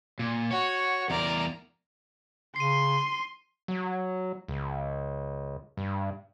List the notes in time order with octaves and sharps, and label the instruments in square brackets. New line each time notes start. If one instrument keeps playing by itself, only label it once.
[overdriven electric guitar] A#2
[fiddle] F#4 [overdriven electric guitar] C#5
[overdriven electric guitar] E2 A#4 [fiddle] D5 A#5
[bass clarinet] C#3 [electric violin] C6 [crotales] C7 D#7
[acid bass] F#3
C#2
G2